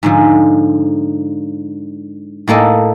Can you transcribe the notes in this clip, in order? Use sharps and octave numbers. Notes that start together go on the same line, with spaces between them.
G#2 D3 F3
A2 A#3 A4 D#5